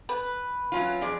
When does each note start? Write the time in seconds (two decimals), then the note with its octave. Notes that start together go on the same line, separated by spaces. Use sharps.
0.09 B4
0.72 F#3 C#4 F4
1.01 F2 G#4 D5